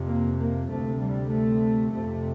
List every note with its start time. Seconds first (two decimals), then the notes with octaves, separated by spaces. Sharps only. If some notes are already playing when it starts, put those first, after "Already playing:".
Already playing: F2 C3
0.09 A#3
0.39 A#3
0.70 D2 C3 A3
1.01 G3
1.32 A3
1.94 F2 C3 A3